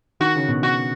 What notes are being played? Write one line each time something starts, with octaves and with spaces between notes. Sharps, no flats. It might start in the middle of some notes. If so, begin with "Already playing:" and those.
D#3 F#4
C#3
B2
F#4